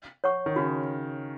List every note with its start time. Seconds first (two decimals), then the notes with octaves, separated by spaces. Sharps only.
0.24 C#5 F#5 C#6
0.46 D#3
0.56 C#3 F#4